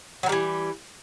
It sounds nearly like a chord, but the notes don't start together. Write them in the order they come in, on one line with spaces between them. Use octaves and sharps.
F#3 D#3 G3 E3